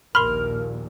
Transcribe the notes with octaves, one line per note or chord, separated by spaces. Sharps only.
A#1 D#2 A#2 A#4 B5 C6 F6